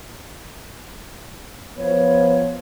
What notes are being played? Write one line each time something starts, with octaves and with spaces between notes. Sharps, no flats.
F3 B3 C#5